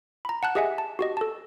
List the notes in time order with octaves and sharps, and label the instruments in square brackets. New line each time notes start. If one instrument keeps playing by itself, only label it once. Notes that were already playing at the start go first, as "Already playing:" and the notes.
[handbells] A#5 B5
F#5 A5 F#6
G4 G#4 D#5 E5 F#5 G#5
A5
F#4 G4 D#5
A4 A5